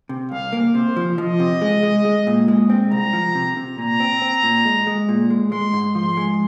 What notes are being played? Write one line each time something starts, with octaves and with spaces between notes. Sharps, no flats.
C3
C2 F5
A#3
C3 C5
F3
F3 D#5
C3
G#3
G#3
G#3
A#2
G#3
C4
C2 A#5
F3
C3
C3
A#2 A#5
C4
C4
A#2
G#3
G#3
A#2
G#3
G#3 C6
G#2
F3 C6
G#3